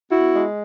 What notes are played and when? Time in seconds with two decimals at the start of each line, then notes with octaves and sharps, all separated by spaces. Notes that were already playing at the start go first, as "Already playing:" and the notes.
0.11 B3 E4 F#4
0.34 G#3